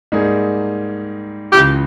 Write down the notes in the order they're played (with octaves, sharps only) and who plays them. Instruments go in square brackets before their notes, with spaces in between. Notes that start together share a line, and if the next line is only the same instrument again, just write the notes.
[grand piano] G#2 G3 A#3 D#4 G#4
[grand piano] C#2 C#3 E3 [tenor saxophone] G4